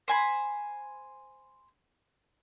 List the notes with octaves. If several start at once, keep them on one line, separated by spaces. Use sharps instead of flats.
C5 G#5 B5